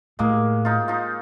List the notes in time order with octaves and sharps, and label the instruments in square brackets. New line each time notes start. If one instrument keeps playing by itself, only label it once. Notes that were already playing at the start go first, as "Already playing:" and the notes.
[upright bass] A2 [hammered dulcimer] G#3 A#3
[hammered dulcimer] D#4 F4
D#4 F4